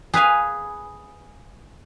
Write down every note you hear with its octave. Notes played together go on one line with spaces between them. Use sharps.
G#4 B4 F5 G#5